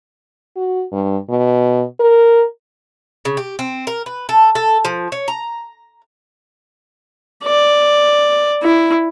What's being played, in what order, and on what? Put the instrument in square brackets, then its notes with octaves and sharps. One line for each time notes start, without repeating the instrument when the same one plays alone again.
[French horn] F#4
G2
B2
A#4
[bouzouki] C#3
G4
C4
A#4
B4
A4
A4
F3
C#5
A#5
[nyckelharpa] D5
E4